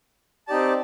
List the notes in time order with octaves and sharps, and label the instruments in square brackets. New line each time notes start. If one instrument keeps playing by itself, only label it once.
[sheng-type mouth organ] C4 D#4 G4 D5 A5